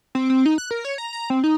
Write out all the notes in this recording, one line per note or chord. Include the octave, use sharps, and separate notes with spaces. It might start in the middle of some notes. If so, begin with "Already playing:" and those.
C4
C4
D#4
F#6
A#4
C#5
A#5
A#5
C4
D#4